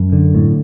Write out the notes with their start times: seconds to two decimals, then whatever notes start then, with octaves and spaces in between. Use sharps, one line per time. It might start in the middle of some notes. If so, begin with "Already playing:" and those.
Already playing: F#2
0.12 D3
0.35 A2